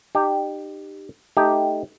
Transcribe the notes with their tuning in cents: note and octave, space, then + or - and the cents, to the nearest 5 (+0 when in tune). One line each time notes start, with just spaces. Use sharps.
D#4 -40 G4 +0
A3 -5 D#4 +0 G4 +0